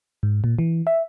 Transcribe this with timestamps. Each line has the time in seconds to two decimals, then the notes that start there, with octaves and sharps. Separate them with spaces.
0.23 G#2
0.44 A#2
0.59 E3
0.87 E5